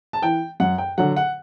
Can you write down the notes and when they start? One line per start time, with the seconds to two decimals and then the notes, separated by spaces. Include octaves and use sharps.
0.13 A5
0.22 E3 G5
0.60 F#2 F#5
0.78 G5
0.98 D3 F#3 F#5
1.16 F#5